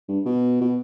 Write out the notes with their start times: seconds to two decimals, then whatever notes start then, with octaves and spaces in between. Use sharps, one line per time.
0.08 G2
0.25 B2
0.61 B2